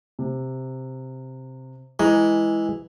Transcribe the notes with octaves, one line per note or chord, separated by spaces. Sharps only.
C3
E3 G#3 E4 A#5